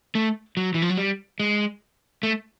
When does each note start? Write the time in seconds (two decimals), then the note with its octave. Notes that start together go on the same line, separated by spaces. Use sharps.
0.15 A3
0.57 F#3
0.74 E3
0.82 F3
0.89 F#3
0.98 G3
1.40 G#3
2.23 A3